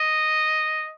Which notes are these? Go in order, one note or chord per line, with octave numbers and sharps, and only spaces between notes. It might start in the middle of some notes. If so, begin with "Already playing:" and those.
Already playing: D#5